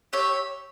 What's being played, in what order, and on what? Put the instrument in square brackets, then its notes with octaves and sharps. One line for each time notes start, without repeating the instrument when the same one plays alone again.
[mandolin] G4 C#5 E5